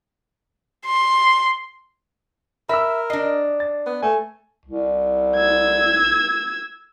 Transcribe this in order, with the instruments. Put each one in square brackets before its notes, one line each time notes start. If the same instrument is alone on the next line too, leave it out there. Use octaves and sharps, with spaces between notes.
[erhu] C6
[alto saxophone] A#4 [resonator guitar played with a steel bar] E5 [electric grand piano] B5 E6
[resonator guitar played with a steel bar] D4 D#5 [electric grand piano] C7
[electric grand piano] A6
[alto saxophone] B3
[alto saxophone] A3 [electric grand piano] G#5
[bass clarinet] C2
[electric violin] E6 G#6